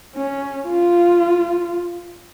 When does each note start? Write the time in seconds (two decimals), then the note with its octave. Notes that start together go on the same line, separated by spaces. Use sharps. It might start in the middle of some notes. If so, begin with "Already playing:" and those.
0.15 C#4
0.67 F4